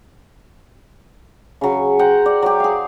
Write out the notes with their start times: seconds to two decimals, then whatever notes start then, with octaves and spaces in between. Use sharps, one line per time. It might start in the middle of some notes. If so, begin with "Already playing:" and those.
1.61 C#3 F#3
1.99 C5 F#5 G5 A#5
2.26 D5
2.42 F#3 G4
2.60 G#4 F5